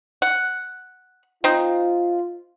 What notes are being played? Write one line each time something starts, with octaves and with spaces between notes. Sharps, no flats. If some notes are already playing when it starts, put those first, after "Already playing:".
F#5
C4 D#4 F4